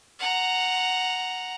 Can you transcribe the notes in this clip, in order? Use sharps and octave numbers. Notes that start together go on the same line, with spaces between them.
F#5 A#5